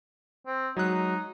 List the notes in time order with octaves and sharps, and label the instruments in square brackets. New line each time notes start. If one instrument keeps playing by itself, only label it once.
[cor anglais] C4
[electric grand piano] F#3 G#3 F#6 [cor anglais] D#4